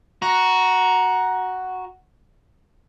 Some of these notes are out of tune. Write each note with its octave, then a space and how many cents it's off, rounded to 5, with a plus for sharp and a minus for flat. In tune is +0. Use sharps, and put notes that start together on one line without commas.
F#4 +0 A#5 +15